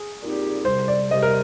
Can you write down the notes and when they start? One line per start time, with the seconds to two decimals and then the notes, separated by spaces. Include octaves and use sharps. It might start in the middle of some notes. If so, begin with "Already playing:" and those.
Already playing: G#4
0.21 A#2 G3 C4 D#4 G4
0.65 C2 C3 G3 C5
0.88 D5
1.11 C2 C3 G3 D#5
1.23 A#4